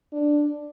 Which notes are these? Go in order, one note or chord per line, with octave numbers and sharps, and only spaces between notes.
D4